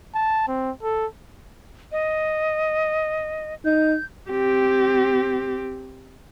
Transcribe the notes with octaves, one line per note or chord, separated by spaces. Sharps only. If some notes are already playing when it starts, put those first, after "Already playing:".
A5
C4
A4
D#5
D#4 G6
C4 G4